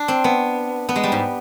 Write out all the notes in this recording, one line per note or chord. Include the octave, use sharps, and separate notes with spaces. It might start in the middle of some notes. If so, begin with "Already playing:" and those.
Already playing: D4
C4
B3
B3
G#3
G3
G#2